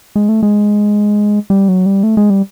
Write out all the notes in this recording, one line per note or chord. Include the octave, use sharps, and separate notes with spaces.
G#3
A3
G#3
G3
F#3
G3
A3
G#3
G3